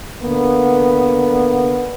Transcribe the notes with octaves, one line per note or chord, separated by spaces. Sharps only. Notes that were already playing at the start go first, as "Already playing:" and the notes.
D3 A#3 B3